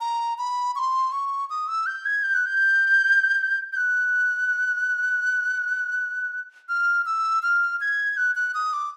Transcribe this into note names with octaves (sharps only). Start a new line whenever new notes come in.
A#5
B5
C#6
C6
C#6
D#6
E6
G6
G#6
G6
F#6
G6
G6
F#6
F6
E6
F6
G#6
F#6
F#6
D#6
D6